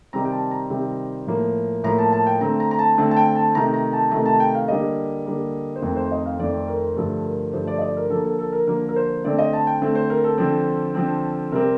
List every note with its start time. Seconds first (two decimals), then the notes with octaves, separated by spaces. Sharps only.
0.13 C3 D#3 G3 C4 A#5
0.25 G5
0.32 A5
0.51 A#5
0.70 C3 D#3 G3 C4
1.27 A2 F3 A#3
1.84 A2 F3 A#3 A#5
1.98 A5
2.13 A5
2.27 G5
2.41 D3 A3 C4 A#5
2.60 A#5
2.71 A#5
2.79 A5
2.98 D3 A3 C4
3.11 A5
3.17 G5
3.36 A5
3.55 C3 D#3 A3 A#5
3.74 A#5
3.93 A5
4.12 C3 D#3 A3 A#5
4.26 A5
4.40 G5
4.55 F5
4.68 D3 G3 A#3 D#5
5.26 D3 G3 A#3
5.76 C5
5.82 F2 D#3 A3 C4 A#4
5.96 C5
6.11 D#5
6.26 F5
6.40 F2 D#3 A3 C4 D5
6.68 A#4
6.96 G2 D3 F3 A3 A4
7.25 A#4
7.53 G2 D3 F3 A3 C5
7.68 D5
7.78 D#5
7.82 D5
7.97 A#4
8.10 D3 F3 A#3 A4
8.24 A4
8.39 A4
8.53 A#4
8.67 D3 F3 A#3 A#4
8.89 A#4
8.96 C5
9.24 D3 A3 C4 D5
9.39 D#5
9.53 A5
9.67 G5
9.82 D3 A3 C4
9.95 C5
10.10 A#4
10.24 A4
10.38 D3 F3 C4
10.95 D3 F3 C4
11.52 C3 G3 C4 A#4